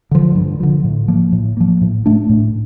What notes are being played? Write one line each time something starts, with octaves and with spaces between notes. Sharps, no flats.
D3 F3
G2
D3 F3
A2
F3 A#3
A2
F3 A#3
A2
A3 D4
A2